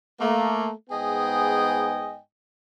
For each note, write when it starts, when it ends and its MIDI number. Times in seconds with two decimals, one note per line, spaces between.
0.21 0.71 57
0.21 0.71 58
0.90 2.19 44
0.90 2.19 59
0.90 2.19 68
0.90 2.19 75
0.90 2.19 79
0.90 2.19 80